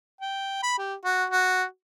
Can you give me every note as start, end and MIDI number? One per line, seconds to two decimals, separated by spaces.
0.21 0.61 79
0.63 0.74 83
0.78 0.94 67
1.04 1.25 66
1.30 1.63 66